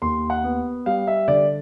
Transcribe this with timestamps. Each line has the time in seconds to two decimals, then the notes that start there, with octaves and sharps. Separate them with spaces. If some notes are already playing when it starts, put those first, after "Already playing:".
0.02 D#2 C6
0.30 F#5
0.44 B3
0.86 G3 F5
1.07 E5
1.28 D3 D5